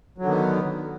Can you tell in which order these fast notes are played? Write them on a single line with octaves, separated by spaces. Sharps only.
F#3 D3 D#3 B3